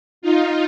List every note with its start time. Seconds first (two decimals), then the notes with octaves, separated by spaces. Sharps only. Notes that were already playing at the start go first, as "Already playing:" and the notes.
0.22 D#4 F4